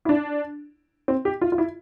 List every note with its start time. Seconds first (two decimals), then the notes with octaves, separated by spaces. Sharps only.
0.05 E4
0.09 D4
1.08 C4
1.25 G4
1.41 F4
1.52 F4
1.58 E4